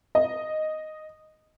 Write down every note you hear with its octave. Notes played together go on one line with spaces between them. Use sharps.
D#5